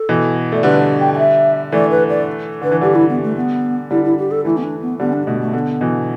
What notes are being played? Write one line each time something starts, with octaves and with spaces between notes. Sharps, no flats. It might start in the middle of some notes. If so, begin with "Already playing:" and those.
Already playing: A4
B2 E3
A3 D5
D3 G3 B4
G5
G5
E5
E3 A3 D5
B4
D5
D3 B4
E3
D3 G3 G4
E4
B3
A3
B3
D3 G3 E4
E4
G4
A4
E3 A3 E4
B3
D4
B3
D3 G3 B3
D4
B2 A3
A3
D3 B3
B2 E3